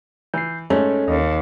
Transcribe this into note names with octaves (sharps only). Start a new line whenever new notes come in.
E3 G6 C7
G#2 G#3 A3 C#4 A4
D#2 D#4